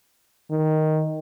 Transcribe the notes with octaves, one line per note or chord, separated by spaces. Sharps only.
D#3